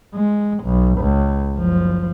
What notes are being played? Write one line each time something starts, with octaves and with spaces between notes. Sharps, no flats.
G#3
B1
C#2
F#1 F3